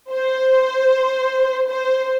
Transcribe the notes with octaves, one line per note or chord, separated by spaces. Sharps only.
C5
C5